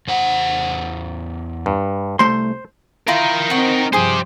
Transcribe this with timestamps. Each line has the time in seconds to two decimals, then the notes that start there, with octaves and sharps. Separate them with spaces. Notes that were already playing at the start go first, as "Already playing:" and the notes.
0.08 E2 C5 F#5
1.66 G2
2.19 C2 A3 C5 C6
3.08 E4 F4 A#4 G5 A#5
3.50 C4 D#4 F#5 C#6
3.93 G2 F3 G4 G#4 C5 D#6